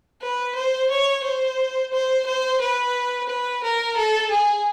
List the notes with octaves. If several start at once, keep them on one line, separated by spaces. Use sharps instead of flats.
B4
C5
C#5
C5
C5
C5
B4
B4
A#4
A4
G#4